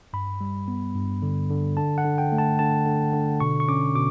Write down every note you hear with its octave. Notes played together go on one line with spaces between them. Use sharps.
G2 B5
G3
B3
G2
D3
D3
D3 A5
F#5
D3
G5
A3
A5
D3 A5
D3
D3
B2 C#6
C#6
C#4 D6
B2 D6